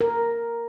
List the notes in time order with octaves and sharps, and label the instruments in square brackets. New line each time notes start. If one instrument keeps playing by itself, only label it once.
[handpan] A#4